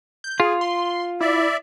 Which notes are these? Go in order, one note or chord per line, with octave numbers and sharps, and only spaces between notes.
G6
F4 G#4
C6
E4 D5 E5